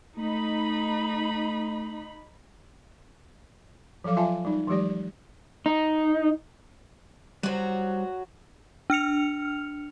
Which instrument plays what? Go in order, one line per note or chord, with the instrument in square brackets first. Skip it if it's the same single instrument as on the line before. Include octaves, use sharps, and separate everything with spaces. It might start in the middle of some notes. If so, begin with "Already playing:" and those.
[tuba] A3 [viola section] D#4 B5
[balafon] F3 F#3 A4 F5 D6
F4 E5 F5 G#5 A5
G3 D#4
E3 F#3 G#3 G4 D5
[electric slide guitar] D#4
[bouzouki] F#3 F#4 [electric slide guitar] G3 C5
[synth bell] D4 F6 C#7 F7